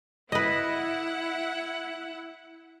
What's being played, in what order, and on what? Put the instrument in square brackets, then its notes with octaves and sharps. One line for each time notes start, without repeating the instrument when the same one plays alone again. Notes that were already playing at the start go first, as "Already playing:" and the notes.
[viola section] E4 F#5 [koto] B4 D#5